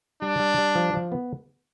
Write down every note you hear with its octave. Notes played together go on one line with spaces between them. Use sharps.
G3 D4
G3
G3
F3
F3
B3